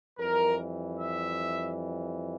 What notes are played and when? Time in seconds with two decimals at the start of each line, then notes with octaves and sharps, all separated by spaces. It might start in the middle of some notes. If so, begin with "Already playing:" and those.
0.19 F2 E3 G3 A#4
0.98 E5